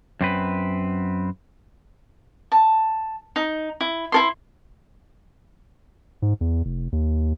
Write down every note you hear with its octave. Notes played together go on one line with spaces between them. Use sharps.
F#2 C4 B4
A5
D#4
E4
E4 A4 C6
G#2
E2
F1
D#2